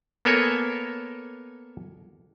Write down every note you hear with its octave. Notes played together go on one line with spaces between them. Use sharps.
A#3 B3 A4 A#4 C#5 G#5